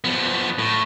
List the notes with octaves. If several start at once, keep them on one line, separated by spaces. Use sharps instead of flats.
F3 B3
A2